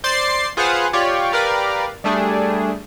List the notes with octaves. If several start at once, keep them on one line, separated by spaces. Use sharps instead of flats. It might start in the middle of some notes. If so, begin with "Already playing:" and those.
C5 D5 C6 A6 C7
F4 G#4 B4 C5 F5 F#5
F4 G4 C#5 D5
G4 A#4 B4 D5 F5
G3 A3 D4 G#4